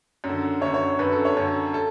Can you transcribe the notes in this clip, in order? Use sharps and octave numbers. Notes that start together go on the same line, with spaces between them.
F#2
D3
F#2 D3 C#5
C#5
F#2 D3 B4
A4
C#5
F#2 D3
A4